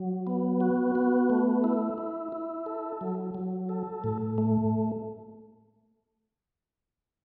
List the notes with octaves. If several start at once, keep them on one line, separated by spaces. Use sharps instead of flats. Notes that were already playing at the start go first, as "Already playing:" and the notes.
Already playing: F#3
B3
F#4
B3
A3
E4
E4
E4
A4
F#3
F#3
A4
A2
A3